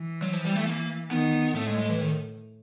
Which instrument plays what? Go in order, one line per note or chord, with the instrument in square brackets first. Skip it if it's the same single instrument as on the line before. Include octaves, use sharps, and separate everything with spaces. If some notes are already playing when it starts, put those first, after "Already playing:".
Already playing: [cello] E3
[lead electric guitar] F#3
F3
G3
A3
A#3
[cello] D#3 [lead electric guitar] B3
[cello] A2 [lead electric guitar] A3
[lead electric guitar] G#3
G#3
E3
D#3